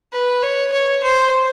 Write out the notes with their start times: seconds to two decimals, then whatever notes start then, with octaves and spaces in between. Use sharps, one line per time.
0.12 B4
0.42 C#5
0.72 C#5
1.03 C5